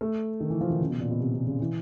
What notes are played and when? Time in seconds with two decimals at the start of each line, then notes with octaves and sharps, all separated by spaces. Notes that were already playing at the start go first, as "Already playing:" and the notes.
0.01 A3
0.40 D#3
0.50 E3
0.61 F3
0.70 D#3
0.80 C#3
0.90 B2
1.00 A#2
1.11 B2
1.20 C3
1.34 C3
1.46 C#3
1.60 E3